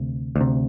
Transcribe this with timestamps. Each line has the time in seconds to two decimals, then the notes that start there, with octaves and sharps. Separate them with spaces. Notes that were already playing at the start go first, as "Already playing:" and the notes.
Already playing: D2 C3
0.36 D2
0.41 C3